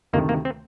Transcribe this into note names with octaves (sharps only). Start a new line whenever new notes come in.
D2 C3 D#3 A3 A#3
A#3
C4